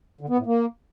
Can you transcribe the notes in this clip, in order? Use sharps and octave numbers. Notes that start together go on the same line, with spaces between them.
D3
B3
A2
A#3